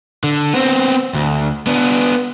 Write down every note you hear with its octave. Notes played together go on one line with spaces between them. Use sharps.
D3
B3 C4
D2
B3 D4